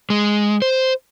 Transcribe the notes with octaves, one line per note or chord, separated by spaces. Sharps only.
G#3
C5